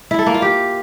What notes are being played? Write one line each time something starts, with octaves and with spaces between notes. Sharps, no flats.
E4
A4
A#3
F4
G4